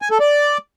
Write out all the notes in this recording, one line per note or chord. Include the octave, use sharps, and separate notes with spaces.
G#5
A4
D5